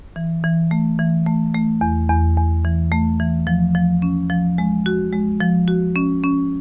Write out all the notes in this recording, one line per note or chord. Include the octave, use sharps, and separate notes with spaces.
E3
E3
A3
E3
A3
A3
E2
E2
E2
E3
A3
E3
F3
F3
C#4
F3
G#3
F#4
G#3
F3
F#4
C#4
C#4